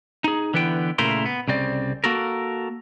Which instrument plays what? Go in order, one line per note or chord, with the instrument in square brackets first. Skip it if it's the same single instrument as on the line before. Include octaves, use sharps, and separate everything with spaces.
[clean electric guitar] D#4 G#4
D3 E3 B3 E4 G5
A#2 C#3 A3 E4 A#4 C6
B3
C2 C#3 C4 D5
A#3 F#4 A4 A#4